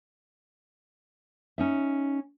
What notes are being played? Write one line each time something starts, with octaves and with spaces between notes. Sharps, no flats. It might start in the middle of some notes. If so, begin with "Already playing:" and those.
C#4 D#4 E5